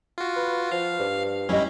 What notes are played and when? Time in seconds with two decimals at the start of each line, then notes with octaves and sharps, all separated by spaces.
0.18 F4 F#4
0.36 B4
0.72 F3 F5
0.99 G2
1.49 G3 C#4 E4 D#5